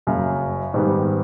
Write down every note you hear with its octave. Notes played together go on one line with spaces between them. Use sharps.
F#1 F#2 C#3
G#2 D#3 G3 B3